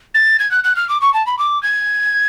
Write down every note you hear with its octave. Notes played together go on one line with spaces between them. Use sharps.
A6
G#6
F#6
F#6
F6
D6
C#6
A5
B5
D6
G#6